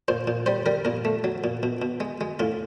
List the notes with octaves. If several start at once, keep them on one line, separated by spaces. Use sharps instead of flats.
A#2 C5
A#2
G3 C5
G3 A#4
A#2 A#4
A3
F#3
A#2
B2
B2
G#3
G#3
A2 F4